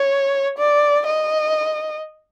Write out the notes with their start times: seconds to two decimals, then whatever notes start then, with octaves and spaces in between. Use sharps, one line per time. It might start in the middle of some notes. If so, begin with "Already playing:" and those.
Already playing: C#5
0.58 D5
1.06 D#5